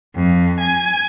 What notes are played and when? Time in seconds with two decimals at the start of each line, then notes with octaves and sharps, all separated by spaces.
0.15 F2
0.61 G#5